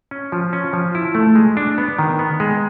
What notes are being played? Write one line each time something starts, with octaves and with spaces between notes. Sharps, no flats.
C#4
F3
C#4
F3
E4
A3
G#3
D4
B3
D#3
B3
G#3